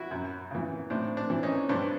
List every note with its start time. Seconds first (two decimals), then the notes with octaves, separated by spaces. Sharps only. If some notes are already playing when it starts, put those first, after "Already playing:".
Already playing: E4 F#4
0.11 F#2
0.51 C#3 E3
0.90 A2 C4 D4
1.17 C4 D4
1.30 E3
1.43 C#4 D#4
1.69 G2 C4 D4